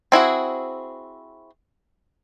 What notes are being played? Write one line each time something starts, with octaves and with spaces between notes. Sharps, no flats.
C4 E4 F#4 G#4